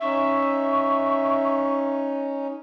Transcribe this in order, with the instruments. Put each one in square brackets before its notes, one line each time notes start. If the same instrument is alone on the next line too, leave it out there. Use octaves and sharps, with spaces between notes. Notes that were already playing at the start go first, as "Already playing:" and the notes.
[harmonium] C#4 D#4 [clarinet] E5 [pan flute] C#6